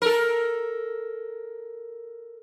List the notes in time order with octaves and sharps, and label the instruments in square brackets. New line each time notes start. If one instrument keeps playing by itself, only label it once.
[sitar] A4 A#4